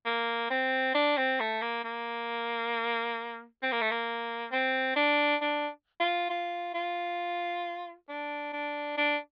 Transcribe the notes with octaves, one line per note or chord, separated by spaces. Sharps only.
A#3
C4
D4
C4
A3
A#3
A#3
C4
A#3
A3
A#3
C4
D4
D4
F4
F4
F4
D4
D4
D4